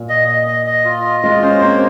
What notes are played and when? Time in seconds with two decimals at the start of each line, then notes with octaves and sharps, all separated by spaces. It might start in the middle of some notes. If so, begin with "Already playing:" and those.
Already playing: A#2
0.09 D#5
0.28 D#5
0.47 D#5
0.66 D#5
0.85 F4
1.04 D#5
1.23 G#3 F4
1.42 C#4 C5
1.61 A#3 C4